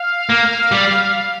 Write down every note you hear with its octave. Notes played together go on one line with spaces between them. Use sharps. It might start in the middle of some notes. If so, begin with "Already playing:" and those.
Already playing: F5
A#3
G3